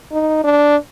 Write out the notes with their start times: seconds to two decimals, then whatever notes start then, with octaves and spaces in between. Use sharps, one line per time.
0.12 D#4
0.44 D4